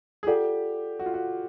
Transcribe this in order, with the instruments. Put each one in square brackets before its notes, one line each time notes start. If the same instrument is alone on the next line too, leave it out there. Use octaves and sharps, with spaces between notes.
[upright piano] G#4
[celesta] F4 A4 D5 F#5 [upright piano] G4
[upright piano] F#4
F4
F#4